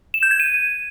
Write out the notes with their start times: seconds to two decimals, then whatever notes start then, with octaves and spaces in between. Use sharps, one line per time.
0.14 E7
0.23 G6
0.31 G#6
0.40 D#7